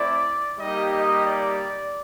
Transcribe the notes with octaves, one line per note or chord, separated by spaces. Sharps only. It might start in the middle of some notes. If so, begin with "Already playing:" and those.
Already playing: A3 C4 E4 D5
G3 A#3 D#4 G4 D#5
D#5
D5